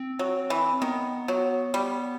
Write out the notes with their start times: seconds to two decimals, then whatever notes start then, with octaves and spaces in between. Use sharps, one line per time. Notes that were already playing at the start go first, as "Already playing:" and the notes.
Already playing: C4
0.19 F#3
0.50 E3
0.82 D#3 B3
1.28 F#3
1.74 G3